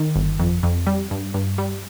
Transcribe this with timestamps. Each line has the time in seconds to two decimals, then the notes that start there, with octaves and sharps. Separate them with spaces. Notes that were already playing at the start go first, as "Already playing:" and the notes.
Already playing: D#3
0.16 G1
0.39 F2
0.63 F2
0.87 G3
1.11 G2
1.34 G2
1.58 G3